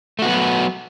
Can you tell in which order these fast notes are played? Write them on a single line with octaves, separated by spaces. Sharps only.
A3 F#4 B3 F#3